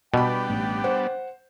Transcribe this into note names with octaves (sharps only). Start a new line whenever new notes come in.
B2 G3 B3 D4 B4 G5 B5
A1
C5 F#5